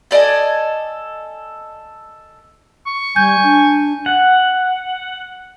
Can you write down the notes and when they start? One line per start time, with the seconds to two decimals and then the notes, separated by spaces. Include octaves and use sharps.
0.11 A4 D5 D#5 G#5
2.86 C#6
3.16 G3 G#5 G6
3.43 D4
4.06 F#5